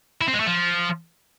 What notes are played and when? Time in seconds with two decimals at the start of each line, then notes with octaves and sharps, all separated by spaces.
0.21 E4
0.28 C4
0.34 G#3
0.40 A3
0.46 F3